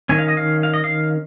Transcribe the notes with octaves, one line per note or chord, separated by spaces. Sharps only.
D#3 C#4 G#5
F5
D#5
F5
F5
D#5
F5